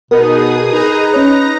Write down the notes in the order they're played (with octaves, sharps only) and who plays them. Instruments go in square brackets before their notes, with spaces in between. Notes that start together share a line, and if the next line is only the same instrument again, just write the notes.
[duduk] B2 [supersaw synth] B3 D#4 [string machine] G#4 D#6 [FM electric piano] A#4
[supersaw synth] D#4 A#5 [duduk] B4
[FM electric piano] C#4 C#5 [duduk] B4 [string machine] A#6